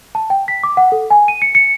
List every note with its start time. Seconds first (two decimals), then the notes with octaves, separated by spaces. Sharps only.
0.15 A5
0.30 G5
0.48 B6
0.64 D6
0.77 F#5
0.92 A4
1.10 G#5
1.28 D#7
1.42 C#7
1.55 C#7